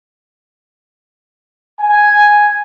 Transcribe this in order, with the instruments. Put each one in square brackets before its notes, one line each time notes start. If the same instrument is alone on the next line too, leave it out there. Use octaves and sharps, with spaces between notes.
[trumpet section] G#5